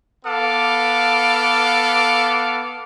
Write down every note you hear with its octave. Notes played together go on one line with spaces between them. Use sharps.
B3 A4 F5 D6